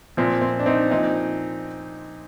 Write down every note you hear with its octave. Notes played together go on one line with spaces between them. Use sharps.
A#2 F3 C4
C4
D4
C4 D#4
A#2 F3 C4 D#4